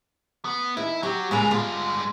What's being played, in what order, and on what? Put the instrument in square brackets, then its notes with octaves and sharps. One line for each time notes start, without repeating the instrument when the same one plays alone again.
[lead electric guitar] B3
[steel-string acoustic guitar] D#2 [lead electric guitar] E4
[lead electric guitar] F#3 [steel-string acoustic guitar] G4
[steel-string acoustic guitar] A#2 G#3 A#5 [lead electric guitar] C#3 B4
[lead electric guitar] G2 G#3 [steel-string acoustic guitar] F4